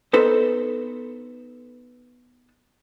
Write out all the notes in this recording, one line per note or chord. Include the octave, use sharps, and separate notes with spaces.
B3 D#4 A4 B4 C5